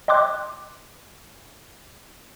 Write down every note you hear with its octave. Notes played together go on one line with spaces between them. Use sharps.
D#5 G5 C6 D6 F#6